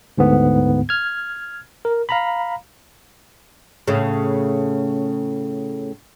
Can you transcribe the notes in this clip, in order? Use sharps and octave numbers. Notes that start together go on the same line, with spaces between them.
D2 G#2 D3 B3
F6 G#6
A#4
F5 A#5 B5
A2 C#3